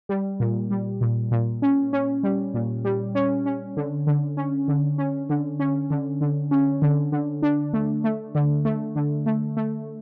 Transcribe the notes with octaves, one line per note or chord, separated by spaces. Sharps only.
G3
A#2
G3
A#2
A#2
C#4
C#4
G3
A#2
G3
C#4
C#4
D3
D3
C#4
D3
C#4
D3
C#4
D3
D3
C#4
D3
D3
D4
A3
A3
D3
A3
D3
A3
A3